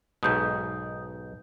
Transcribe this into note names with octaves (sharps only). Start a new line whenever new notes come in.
B1 G#2 B2 D#6 G6